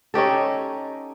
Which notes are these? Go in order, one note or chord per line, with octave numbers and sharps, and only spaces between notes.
C#4 D#4 G4 A4